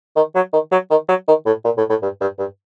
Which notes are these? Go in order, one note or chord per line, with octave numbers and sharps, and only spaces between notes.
D#3
F#3
D#3
F#3
D#3
F#3
D#3
A2
A#2
A2
A2
G2
G2
G2